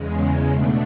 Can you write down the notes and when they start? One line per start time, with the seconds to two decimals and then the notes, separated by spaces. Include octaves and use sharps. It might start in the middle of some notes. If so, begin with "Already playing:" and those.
Already playing: E2 C#3 G#3
0.52 B2 A3 D4